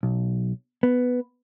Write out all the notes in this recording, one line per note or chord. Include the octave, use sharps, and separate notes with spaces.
B1
B3